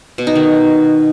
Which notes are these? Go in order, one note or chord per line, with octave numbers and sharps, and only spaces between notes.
B2
D#4
D#3